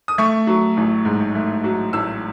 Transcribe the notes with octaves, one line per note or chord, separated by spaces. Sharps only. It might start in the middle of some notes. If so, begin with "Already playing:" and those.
D#6
A3 C#6
F#3
A1
G#2
A3
F#3
A1 E6